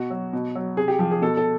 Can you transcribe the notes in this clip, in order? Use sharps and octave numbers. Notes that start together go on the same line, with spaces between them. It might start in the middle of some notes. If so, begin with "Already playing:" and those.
Already playing: B2 F#4
F#3
B2
F#3
C3 G#4
G4
F3 G4
G#4
B2 A4
A4